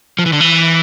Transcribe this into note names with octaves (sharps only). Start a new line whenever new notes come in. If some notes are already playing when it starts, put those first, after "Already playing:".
F3
E3
D3
E3